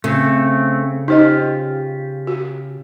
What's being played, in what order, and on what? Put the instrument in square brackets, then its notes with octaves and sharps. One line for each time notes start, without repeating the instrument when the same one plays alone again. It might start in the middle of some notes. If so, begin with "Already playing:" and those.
[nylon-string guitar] C#3 [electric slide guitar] A3 C4
[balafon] D#4 C5 D#5 [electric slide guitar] F4 G4
[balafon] F#4